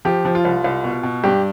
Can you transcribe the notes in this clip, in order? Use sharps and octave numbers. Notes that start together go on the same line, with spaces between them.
F3 G4
F3
F4
C2
C2
B2
B2
G2 G4